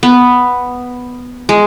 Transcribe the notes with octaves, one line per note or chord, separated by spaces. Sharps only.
B3
G#3